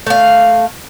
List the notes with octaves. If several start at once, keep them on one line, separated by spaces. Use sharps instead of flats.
A3 F5